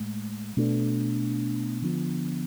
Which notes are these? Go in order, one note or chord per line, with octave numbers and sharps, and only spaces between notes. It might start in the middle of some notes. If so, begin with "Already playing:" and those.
Already playing: A2 G#3
B2 A3 D4
D3 F3 B3